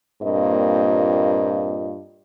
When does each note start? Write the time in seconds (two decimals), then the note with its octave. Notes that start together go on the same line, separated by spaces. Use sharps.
0.21 G2 A#2 A#3 C4 F4 D#5